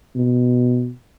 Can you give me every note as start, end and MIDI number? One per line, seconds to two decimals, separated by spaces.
0.16 0.91 47